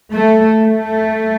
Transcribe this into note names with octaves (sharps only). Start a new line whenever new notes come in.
A3
A3